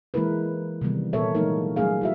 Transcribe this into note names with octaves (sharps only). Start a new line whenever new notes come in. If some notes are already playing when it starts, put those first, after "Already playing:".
E3 G#3 A#3 E4 A#4 B4
C3 D#3 E3 G3 B3
A#2 B3 A4 A#4 C#5 E5
E3 F#3 G#3 A#3 D#4 A#4
F#3 G3 A3 C#4 G#4 F5
E4 F#4 E5